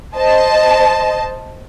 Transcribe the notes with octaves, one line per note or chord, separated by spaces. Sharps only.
C5 D#5 A5